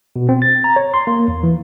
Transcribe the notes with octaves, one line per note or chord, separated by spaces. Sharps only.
B2
C4
A6
A#5
C#5
C6
A#3
E2
E3